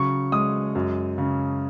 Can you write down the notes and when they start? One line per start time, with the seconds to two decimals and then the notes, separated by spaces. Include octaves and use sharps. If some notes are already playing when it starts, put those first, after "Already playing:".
Already playing: C#3 F#3 C#6
0.32 G#3 D#6
0.75 F#2
1.18 C#3